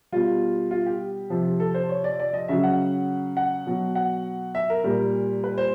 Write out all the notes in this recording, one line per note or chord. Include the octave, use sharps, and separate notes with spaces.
B2 G3 F4
F4
G4
C3 F3
A4
C5
C#5
D5
D5
D#5
C#3 F#3 E5
F#5
F#5
B2 F#3
F#5
E5
A#4
A#2 G3 A#4
B4
C5